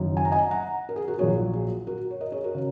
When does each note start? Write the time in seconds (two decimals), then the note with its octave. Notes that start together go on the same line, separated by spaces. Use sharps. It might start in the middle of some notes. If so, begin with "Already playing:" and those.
Already playing: F#1 F#2 D#3
0.17 G#5
0.25 A#5
0.31 D#5 G#5
0.51 F#5 A#5
0.89 A#4
0.96 G#4
1.08 F#4 A#4
1.19 A#1 A#2 F#3 G#4 C#5
1.53 G#4
1.87 F#4 A#4
2.11 C#5
2.21 A#4 D#5
2.32 G#4 C#5
2.44 F#4 A#4
2.55 C#3